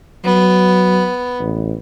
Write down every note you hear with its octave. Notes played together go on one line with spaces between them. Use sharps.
F#3 B3
A1